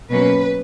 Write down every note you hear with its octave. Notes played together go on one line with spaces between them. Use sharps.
B2 F#3 A#3 C#4 B4